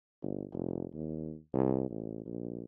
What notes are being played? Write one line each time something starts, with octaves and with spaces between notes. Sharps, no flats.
G1
F1
D#2
C2
A1
A#1